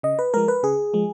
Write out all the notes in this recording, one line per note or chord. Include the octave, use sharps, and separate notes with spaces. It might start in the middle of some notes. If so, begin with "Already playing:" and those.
C#3 D#5
B4
F3 G#3 A#4
B4
C#3 G#4
F3 G#3